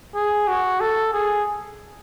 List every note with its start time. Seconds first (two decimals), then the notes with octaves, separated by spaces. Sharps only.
0.15 G#4
0.48 F#4
0.80 A4
1.13 G#4